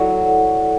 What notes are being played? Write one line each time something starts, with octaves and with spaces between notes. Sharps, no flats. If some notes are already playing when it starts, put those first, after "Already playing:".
Already playing: F#3 E4 A4 D5 F#5